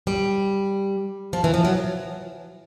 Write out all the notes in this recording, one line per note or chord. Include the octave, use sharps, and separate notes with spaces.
G3
F3
E3
F3
F#3